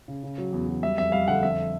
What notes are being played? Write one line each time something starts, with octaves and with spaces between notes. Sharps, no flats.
C#3
C#3
F#3
E2
F#3
G3 E5
F2 E5
G3 F5
D3 F#5
F2 E5